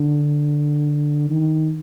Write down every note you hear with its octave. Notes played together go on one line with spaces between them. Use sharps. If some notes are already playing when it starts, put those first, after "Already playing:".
Already playing: D3
D#3